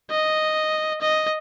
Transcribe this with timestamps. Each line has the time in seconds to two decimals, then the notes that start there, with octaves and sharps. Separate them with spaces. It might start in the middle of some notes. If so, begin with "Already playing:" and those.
0.11 D#5
1.01 D#5